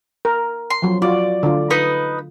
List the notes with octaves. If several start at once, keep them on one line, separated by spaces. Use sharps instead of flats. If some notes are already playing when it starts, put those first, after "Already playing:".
A#4
C6
F3 F#3
F4 F#4 D5
D3 F4
D#4 B4 D#6